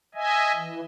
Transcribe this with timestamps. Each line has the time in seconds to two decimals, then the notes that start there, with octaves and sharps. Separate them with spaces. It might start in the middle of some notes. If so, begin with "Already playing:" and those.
0.15 D#5 E5 G#5
0.55 E3